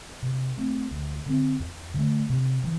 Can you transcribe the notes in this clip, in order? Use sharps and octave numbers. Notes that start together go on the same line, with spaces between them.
C3
A3 C4
D2
D3 C4
E2
D3 A3
C3
E3